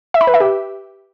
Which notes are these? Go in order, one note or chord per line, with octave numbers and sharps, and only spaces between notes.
E5
B5
B4
E5
G4